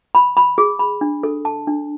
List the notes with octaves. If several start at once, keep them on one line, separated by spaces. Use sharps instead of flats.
B5
B5
G#4
B5
D4
A4
A5
D4